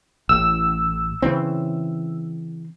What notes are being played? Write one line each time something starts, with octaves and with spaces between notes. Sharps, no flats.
A1 E6
C#3 E3 C4